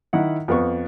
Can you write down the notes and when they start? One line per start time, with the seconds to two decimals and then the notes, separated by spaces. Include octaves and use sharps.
0.13 D#3 E4 F#5
0.48 F2 B3 C#6